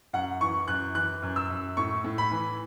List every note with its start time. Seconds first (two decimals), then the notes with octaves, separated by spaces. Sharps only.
0.13 F#2 F#5
0.40 E3 C#6
0.68 F#2 F#6
0.95 E3 F#6
1.22 F#2
1.36 E6
1.50 F#2
1.77 A2 C#6
2.04 A2
2.18 B5
2.31 E3